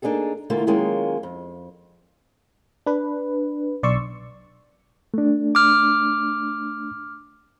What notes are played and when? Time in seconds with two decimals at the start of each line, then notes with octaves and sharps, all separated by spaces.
0.02 A#3 D4 D#4 G#4 A4
0.50 D2 D3 E3 A3 A#3 F4
0.67 D#3 F#3 G#3 A#3 C#4 F4
1.23 F2
2.86 D4 B4
3.83 B1 D5 C6 C#6 E6
5.14 A3 D4
5.55 D6 F6